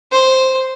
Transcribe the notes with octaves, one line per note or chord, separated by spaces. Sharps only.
C5